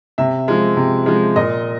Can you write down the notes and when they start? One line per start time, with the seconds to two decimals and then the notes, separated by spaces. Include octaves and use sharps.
0.18 C3 E5
0.48 F3 G#3
0.77 C3
1.06 F3 G#3
1.36 A#2 D#5